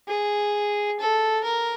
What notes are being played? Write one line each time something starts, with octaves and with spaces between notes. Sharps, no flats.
G#4
A4
A#4